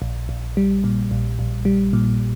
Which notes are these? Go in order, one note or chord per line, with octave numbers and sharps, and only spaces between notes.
A#1
A#1
G3
A#2
A#1
A#1
G3
A#2